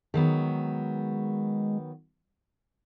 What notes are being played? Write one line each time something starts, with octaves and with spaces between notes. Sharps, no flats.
D#3 F#3 G#3 B3